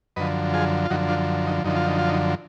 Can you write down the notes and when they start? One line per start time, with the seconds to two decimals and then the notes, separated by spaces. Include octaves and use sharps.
0.16 F#2 D3 F3 B4 D#5
0.53 F4 G#4
0.85 F4
0.90 F#2 D3 F3 D#4 F#4
1.09 D4 F4
1.47 D#4
1.64 F#2 D3 F3 D#4
1.76 F4
1.87 D#4
1.99 F4
2.09 D#4